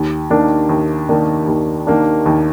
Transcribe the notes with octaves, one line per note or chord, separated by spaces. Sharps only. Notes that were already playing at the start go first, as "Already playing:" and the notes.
Already playing: D#2
D#3 A#3 D4
D#2
D#3 A#3 D4
D#2
D#3 A#3 D4
D#2